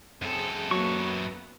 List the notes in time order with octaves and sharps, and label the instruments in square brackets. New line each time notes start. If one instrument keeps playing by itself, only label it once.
[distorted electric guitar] F#2 A4 [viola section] C4 G#4
[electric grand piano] F#3 [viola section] A#3 B3 B4 [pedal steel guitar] C#6